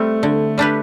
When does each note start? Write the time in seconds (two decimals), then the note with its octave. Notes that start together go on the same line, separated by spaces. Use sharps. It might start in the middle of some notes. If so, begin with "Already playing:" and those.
Already playing: G3 A3 C4
0.23 D3
0.58 G3 D4 G4 B4